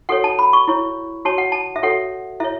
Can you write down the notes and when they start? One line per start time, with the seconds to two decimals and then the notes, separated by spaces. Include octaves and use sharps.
0.09 F#4 A4 C#5 F#5
0.24 A5
0.39 B5
0.53 C#6
0.68 E4 C#5
1.25 F#4 C#5 A5
1.38 F#5
1.52 A5
1.76 E5
1.83 F#4 A4 C#5 F#5
2.40 E4 C#5 E5